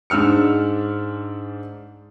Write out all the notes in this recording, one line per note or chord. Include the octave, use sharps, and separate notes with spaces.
G#2 D4 E6 F6 C#7